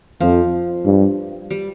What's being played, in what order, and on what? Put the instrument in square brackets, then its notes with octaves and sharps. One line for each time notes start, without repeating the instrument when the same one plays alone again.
[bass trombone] F2 [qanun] F3
[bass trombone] G2
[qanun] G3